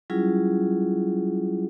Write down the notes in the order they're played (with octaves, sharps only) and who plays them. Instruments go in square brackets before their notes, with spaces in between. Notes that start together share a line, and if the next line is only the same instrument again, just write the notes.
[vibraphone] F#3 G3 C#4 E4 F4 G#4